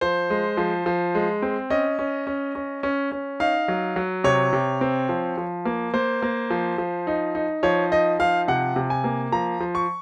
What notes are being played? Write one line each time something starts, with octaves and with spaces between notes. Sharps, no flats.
F3 C5
G#3
F3
F3
G#3
C4
C#4 D#5
C#4
C#4
C#4
C#4
C#4
D#4 F5
F#3
F#3
C3 C#5
C3
C4
F3
F3
A#3
A#3 C5
A#3
F3
F3
D#4
D#4
F3 C#5
D#4 D#5
F3 F5
C3 F#5
C3
G#5
A#3
F3 A#5
F3
C#6